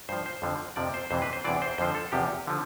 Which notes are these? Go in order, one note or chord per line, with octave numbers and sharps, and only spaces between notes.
G2 F3 C5
C5
F2 D3 F3
F2 C3 F3 D5
C5
F2 C3 E3 C5
B4
C5
E2 C3 E3 D5
C5
F2 D3 F3 C5
A4
E2 C3 F3 G4
D3 F3